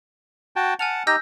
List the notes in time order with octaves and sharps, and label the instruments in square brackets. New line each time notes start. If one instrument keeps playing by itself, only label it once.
[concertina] F#4 G5 A5
[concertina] F#5 A5 [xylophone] G#5 F6 F7
[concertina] D#4 G4 D#5 [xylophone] E6 G6 A#6